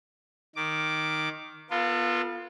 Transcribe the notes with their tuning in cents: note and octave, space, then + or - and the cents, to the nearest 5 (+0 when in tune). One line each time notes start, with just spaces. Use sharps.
D#3 +0 D6 +0
B3 -20 F4 +0 A4 +35